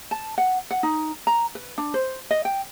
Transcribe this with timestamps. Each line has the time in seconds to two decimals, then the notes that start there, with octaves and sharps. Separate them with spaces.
0.11 A5
0.38 F#5
0.71 F#5
0.83 D#4
1.27 A#5
1.55 B4
1.78 D4
1.94 C5
2.31 D#5
2.45 G5